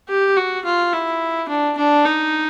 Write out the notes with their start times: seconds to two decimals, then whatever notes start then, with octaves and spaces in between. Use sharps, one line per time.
0.09 G4
0.37 F#4
0.65 F4
0.93 E4
1.48 D4
1.77 D4
2.05 D#4